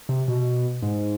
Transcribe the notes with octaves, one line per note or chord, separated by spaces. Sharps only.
C3
B2
G#2